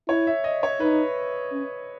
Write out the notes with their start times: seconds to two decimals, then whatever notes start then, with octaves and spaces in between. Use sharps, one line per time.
0.08 E4 C#5
0.27 E5
0.44 D#5
0.63 C#5
0.80 D#4 B4
1.52 C#4